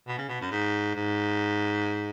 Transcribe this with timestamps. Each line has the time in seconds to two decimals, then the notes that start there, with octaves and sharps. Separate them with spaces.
0.07 B2
0.18 C#3
0.28 B2
0.41 F#2
0.51 G#2
0.95 G#2